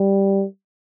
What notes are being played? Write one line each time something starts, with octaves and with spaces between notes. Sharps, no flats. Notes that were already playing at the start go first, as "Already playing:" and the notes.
Already playing: G3